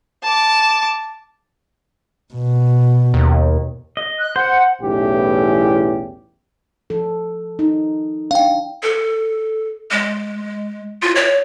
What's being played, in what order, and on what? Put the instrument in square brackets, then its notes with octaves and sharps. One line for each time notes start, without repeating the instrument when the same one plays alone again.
[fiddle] A5 D6
[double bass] B2
[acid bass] D#2
[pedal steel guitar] D#5
[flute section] F#6
[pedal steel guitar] C5 [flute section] F#5
[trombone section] B1 E2 A2 E3 C#4 G4
[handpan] F3 A4
D#4
[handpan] D4 [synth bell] F5 G5
[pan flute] A4
G#3
F4
C#5